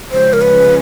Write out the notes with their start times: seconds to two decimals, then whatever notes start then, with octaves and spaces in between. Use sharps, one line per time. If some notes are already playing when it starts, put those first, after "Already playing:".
0.11 C#3 F3 G#3 C#4 C5
0.33 A#4
0.42 B4